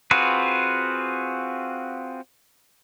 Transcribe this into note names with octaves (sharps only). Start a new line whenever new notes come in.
C4 F4 F#4 G#4 B4